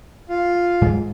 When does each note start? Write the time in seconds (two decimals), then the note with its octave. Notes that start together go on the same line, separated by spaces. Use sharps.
0.29 F4
0.82 G#2 G#3